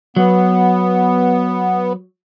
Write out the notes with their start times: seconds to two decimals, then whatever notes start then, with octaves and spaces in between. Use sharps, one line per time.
0.16 F#3 B3